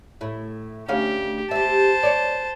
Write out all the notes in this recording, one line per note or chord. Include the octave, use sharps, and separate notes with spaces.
A2 E4
D2 C#4 G4 F5
G4 C5 E5 A5
C#5 D5